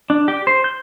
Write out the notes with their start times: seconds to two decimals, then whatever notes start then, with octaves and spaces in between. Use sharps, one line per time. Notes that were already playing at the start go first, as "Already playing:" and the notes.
0.10 D4
0.28 G4
0.47 C5
0.64 G6